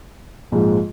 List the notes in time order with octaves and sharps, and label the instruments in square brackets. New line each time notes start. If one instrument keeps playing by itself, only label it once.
[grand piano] A#1 G#2 F3 G#3